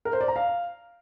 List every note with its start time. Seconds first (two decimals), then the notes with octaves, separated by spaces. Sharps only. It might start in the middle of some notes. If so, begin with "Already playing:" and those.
0.05 A#4
0.13 C5
0.21 D5
0.28 A#5
0.36 F5